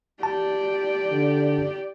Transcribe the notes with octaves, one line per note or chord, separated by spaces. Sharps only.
G4 D5 A5
D3